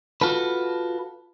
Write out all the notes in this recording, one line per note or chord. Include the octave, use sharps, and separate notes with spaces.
F4 F#4 A4 B4